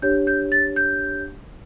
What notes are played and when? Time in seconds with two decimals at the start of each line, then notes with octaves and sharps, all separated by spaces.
0.02 D4 G4 C#5 G6
0.27 G6
0.52 A6
0.76 G6